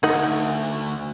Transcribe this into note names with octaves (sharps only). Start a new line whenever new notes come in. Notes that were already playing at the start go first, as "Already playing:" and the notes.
D2 D#4 D#5 F#5